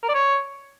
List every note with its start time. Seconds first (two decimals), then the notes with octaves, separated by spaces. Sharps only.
0.03 A#4
0.09 D5
0.14 C#5